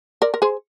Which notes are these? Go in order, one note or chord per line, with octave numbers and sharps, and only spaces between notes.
A#4 D5
A#4
G#4 C5